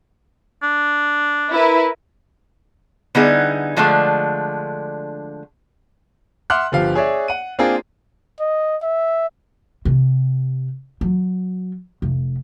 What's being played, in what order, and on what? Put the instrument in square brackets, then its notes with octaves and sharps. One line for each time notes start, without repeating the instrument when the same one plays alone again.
[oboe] D4
[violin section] E4 A#4 B4
[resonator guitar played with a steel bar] D3 G3 B3 D#4 E4 G#4
D3 F3 G#3 A3 D4
[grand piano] E5 F#5 C6 D6 F6 F#6
G1 F3 G4 F5
G#4 C#5 D5 E5
F#5 D#7
A#3 C4 D4 F4 G#4 A#4
[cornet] D#5
E5
[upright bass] C3
F#3
F1